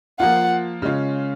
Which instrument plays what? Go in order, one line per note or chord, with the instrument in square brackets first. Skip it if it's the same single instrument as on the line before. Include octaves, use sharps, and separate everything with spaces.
[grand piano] F3 A#3 F4 [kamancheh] F#5
[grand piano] C#3 G#3 C#4 F4